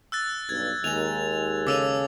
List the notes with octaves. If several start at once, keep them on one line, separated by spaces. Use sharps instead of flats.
E6 F#6 A6
B1 G2 G#6
D#2 G#3 G#5 A#5 F7
C#3 A4 G#5 D6 E6 F7